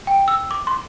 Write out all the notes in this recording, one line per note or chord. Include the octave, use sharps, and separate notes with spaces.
G5
E6
D6
C6